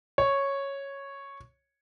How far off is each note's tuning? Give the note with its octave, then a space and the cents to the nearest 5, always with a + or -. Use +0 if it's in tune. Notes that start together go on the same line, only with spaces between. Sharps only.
C#5 -5